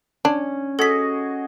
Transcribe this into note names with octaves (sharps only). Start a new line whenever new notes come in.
C#4 D4
F#4 G#4 A4 D#5 B6